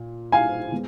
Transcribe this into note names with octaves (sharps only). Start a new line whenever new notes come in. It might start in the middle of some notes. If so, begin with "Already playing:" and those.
Already playing: A#2
F5 G#5
G#3 B3